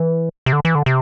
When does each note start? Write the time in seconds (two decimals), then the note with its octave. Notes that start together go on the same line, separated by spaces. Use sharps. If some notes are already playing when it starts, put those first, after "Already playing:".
Already playing: E3
0.46 C3
0.53 D3
0.65 E3
0.75 D3
0.86 C3